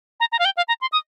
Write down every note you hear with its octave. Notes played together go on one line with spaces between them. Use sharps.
A#5
A#5
F5
G5
F5
A#5
C6
D#6